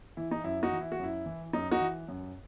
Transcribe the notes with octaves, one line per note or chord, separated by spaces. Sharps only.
E3 E4
D#4
F#2 E4
D#4 F#4
E3
E4
F#4
F#2 E4
E3
F#2 D#4
D#4 F#4
E3
F#2